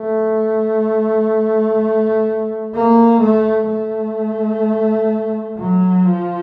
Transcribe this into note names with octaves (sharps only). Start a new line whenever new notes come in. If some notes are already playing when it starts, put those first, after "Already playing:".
Already playing: A3
A#3
A3
A3
F#3
F3